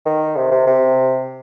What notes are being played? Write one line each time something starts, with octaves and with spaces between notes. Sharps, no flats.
D#3
C3
C3
C3